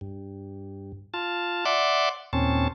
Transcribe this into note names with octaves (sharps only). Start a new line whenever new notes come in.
G2
F4 A5
D5 E5 F#5 C6 D6
D#2 A#2 C4 C#4 A5